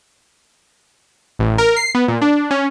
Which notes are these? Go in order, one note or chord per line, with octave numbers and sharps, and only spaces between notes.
A1
A#4
C7
B3
A#2
D4
C#4